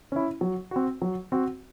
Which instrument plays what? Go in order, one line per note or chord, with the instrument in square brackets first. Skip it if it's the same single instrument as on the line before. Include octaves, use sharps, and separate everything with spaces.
[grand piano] C#4 E4
F#3
C4 F#4
F#3
C4 F#4